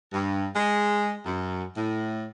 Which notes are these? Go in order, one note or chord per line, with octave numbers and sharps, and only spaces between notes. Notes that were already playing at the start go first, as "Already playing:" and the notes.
G2
G#3
F#2
A2